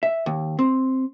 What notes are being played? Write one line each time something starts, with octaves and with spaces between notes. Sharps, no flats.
E5
D#2
C4